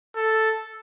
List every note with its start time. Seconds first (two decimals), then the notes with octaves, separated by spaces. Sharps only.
0.15 A4